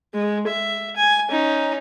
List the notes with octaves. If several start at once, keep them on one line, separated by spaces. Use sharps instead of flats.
G#3
E5
G#5
C#4 D#4